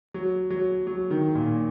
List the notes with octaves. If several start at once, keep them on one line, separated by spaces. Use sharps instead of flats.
F#3
F#3
F#3
D#3
A#2